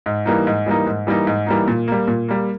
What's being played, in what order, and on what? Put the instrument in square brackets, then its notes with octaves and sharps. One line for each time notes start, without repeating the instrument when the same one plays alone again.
[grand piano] G#2
E3 G3 A#3 D#4
G#2
E3 G3 A#3 D#4
G#2
E3 G3 A#3 D#4
G#2
E3 G3 A#3 D#4
A#2
G3 A#3
A#2
G3 A#3